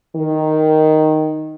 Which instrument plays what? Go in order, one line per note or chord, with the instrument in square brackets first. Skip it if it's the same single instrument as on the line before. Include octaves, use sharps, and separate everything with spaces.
[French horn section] D#3